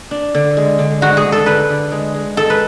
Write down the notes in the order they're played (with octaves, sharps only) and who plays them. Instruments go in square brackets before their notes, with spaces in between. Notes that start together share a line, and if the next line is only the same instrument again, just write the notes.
[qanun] D4
D3
G#3
D3
[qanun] G#3 [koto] F#4
[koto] G#4
[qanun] D3
[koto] A4
[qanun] D3 [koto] B4
[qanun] D3
G#3
G#3
[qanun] G#3 [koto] A4
[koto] B4